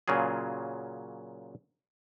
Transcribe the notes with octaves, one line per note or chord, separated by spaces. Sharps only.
A#2 C#3 F#3 F4 G#4